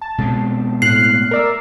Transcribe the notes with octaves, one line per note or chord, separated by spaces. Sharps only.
A5
B2 G#3 C4
A2 F6 F#6 C7
A#4 D5 E5